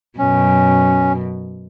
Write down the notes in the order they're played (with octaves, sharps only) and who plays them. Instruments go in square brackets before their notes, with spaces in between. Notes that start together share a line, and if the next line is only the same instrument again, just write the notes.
[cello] F#2 B2 [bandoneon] C#4